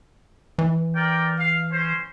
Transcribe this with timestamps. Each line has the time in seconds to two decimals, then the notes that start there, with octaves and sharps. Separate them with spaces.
0.59 E3
0.95 A#4 D5 G5
1.39 F5
1.73 C#4 C5